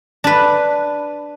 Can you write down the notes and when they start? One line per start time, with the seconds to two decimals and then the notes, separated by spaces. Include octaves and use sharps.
0.24 D4 B4